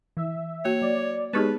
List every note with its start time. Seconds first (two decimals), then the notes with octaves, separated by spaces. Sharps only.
0.17 E3 E5
0.65 A#3 F#4 C#5
0.82 F#3 D5
1.33 G#3 B3 D#4 G4 G#4 B4 C#5 A5